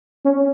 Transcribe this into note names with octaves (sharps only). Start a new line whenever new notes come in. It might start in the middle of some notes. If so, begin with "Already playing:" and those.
C#4